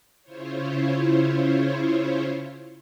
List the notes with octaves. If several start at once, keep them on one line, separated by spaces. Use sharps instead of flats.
C#3 E4 F4 C5 C#5